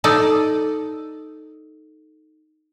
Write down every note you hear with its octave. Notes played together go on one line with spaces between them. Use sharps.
D#4 A4 D5